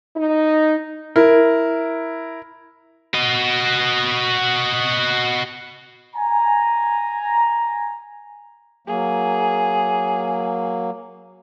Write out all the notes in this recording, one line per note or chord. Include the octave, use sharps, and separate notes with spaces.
D#4
E4 A#4
F#4 D#5
G#5 A#5
F#3 A#3 G#4